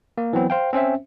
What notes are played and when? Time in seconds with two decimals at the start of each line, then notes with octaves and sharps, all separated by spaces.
0.18 A#3
0.33 E3 F#3 B3 C4
0.50 C5 F5 G5
0.73 C4 C#4 C5 E5